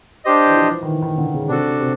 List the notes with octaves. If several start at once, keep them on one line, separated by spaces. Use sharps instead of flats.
D4 G4 C5 D#5
E3
F3
D#3
E3
D#3
D3
C#3
C3 D4 F#4 A4
C3